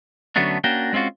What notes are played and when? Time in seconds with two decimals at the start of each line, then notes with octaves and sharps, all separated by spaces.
0.36 D3 F#3 A3 B3 C#4 D4
0.64 A#3 C#4 D4 F#4 G5
0.93 G#3 C4 C#4 F4 F#4